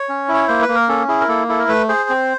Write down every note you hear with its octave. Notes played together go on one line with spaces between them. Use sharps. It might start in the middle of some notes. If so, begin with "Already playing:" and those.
Already playing: C#5
C#4
E4
C#5
A#3 C5
B4
A#3
A#4
C#4 A4
E4 G#4
A#4
A#3 A4
E4 A4
A#4
A3 B4
G#4 C5
C4